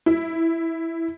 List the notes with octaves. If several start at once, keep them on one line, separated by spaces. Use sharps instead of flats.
E4